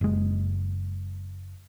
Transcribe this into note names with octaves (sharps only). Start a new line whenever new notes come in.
F#1 G#3